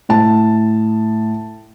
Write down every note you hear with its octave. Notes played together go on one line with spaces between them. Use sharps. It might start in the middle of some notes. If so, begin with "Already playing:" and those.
A2 A5